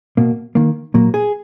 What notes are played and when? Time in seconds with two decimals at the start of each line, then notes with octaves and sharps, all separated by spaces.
0.17 B2 A#3
0.55 D#3 A#3
0.94 A#2 F#3 A#3
1.14 G#4